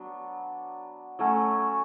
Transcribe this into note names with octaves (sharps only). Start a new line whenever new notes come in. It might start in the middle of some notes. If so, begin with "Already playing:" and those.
Already playing: F#3 B3 D4
F#3 A3 C#4 F#4